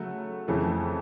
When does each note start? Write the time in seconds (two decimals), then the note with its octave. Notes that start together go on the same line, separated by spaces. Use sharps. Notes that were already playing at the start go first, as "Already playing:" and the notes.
Already playing: C#3 F#3 A3
0.48 F2 C#3 E3 A3